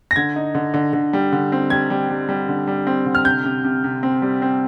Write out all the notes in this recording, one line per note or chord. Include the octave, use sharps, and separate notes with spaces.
A#6
D3 G#6
D#4
D3
D3
D3
G3
D3
C4
G3 G#6
G3
G3
G3
D3
G3
C4
D3
F6
C3 G6
C3
C3
C3
C4
G3
C4